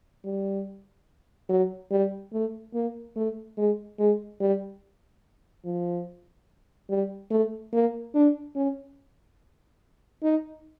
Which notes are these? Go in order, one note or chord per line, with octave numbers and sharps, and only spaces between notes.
G3
F#3
G3
A3
A#3
A3
G#3
G#3
G3
F3
G3
A3
A#3
D4
C#4
D#4